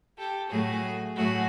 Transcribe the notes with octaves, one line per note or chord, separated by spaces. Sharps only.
G4 A4
A2 F#3 A3 F#4 G#4
A2 F#3 A3 F#4 G#4